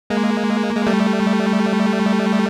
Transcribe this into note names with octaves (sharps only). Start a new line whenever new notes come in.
G#3 A#3
G#3
G3 A3